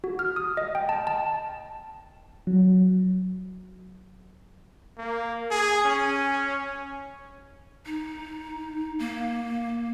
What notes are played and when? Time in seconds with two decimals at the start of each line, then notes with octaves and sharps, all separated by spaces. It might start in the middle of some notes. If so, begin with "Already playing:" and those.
0.04 F#4
0.19 F6
0.36 D#6
0.57 D#5
0.75 G5
0.89 A5
1.07 A5
2.47 F#3
4.98 A#3
5.51 G#4
5.84 C#4
7.86 D#4
8.99 A#3